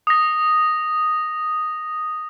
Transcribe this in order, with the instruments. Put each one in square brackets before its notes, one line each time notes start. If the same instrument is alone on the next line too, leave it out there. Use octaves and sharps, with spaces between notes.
[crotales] D#6 A#6